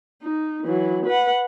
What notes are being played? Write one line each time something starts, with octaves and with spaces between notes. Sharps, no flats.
D#4
E3 F#3
B4 F#5